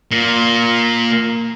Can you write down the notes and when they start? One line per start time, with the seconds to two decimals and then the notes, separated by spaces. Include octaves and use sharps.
0.11 A#2